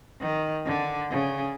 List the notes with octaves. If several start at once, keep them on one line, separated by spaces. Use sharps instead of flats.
D#3
D3
C#3